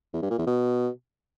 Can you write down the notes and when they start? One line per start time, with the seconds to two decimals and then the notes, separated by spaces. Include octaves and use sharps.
0.14 E2
0.22 G2
0.30 A#2
0.38 E2
0.47 B2